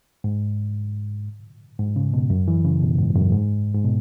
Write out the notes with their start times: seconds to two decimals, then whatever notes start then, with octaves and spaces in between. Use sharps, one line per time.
0.24 G#2
1.79 G#2
1.96 C#3
2.14 B2
2.30 F#2
2.48 E3
2.64 C#3
2.82 B2
2.98 G#2
3.16 F#2
3.32 G#2
3.74 G#2
3.84 B2